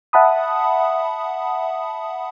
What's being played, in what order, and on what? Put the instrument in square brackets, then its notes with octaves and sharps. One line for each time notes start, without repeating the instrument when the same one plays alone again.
[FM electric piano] E5 F#5 A5 B5 D#6